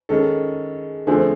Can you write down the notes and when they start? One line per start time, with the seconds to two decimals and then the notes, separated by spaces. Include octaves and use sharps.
0.09 D#3 G#3 C#4 A4
1.07 D3 F3 A3 C4 G#4